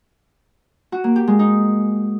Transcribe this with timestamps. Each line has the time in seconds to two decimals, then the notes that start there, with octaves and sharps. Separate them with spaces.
0.92 F#4
1.04 A#3
1.16 G4
1.28 G#3
1.39 D#4